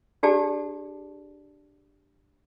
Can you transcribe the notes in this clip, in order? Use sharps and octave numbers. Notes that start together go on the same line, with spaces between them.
D4 G4 G#4 D5 A5